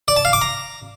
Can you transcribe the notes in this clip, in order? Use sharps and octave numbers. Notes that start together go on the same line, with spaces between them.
D5
A5
F5
D6
A#5